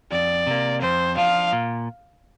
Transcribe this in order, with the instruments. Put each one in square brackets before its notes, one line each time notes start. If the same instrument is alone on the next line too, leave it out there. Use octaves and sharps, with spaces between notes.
[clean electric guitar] F2 [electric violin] D5
[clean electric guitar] C3 A#3
[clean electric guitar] F2 [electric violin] C5
[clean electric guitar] F3 D4 F4 [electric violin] F5
[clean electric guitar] A#2